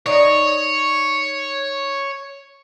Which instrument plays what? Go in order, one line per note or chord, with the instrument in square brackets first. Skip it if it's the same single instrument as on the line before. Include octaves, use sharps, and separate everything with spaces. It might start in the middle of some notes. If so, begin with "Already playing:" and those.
[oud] D#4 D5 [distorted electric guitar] C#5